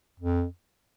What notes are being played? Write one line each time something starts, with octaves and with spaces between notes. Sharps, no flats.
F2